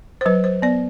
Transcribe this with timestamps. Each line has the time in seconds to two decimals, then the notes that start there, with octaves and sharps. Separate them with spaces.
0.21 C5
0.26 F#3 B4
0.44 C5
0.62 B3 D5